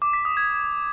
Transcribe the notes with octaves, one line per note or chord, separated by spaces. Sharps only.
D6
B6
D#6
G#6